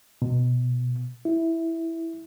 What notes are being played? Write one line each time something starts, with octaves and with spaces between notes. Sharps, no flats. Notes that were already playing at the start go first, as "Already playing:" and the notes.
B2
E4